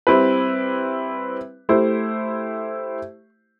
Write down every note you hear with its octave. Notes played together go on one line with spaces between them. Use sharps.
G3 C4 E4 B4
A3 E4 G4 C5